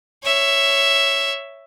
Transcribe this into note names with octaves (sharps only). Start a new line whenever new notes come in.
C#5 E5